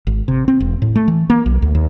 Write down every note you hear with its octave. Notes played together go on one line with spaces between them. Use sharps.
G#1
C3
C4
E1
A2
A3
E3
A#3
B1
D2
D#2